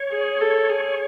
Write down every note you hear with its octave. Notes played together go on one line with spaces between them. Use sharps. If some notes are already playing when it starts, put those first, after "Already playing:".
Already playing: C#5
G#4
A4
G#4